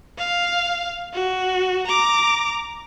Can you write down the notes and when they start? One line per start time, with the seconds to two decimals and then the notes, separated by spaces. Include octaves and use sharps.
0.18 F5
1.14 F#4
1.87 A#5 D6